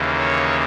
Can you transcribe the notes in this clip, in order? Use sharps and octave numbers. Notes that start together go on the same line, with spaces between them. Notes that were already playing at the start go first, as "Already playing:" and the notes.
Already playing: D#2 C#3 E3 A#3
C#5